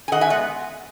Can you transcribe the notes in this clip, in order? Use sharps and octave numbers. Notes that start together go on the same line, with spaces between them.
G#5
D#3 D#5 F#5
E5 G#5
G#3 B3 D#5 F#5